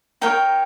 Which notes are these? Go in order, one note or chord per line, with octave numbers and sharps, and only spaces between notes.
D#4 A#4 C#5 G5